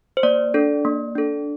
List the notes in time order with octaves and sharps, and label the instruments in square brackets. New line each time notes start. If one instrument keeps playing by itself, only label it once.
[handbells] C5
A#3 D5
D4 A4
A#3
D4 A4